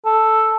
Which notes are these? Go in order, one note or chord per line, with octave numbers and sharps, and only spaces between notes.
A4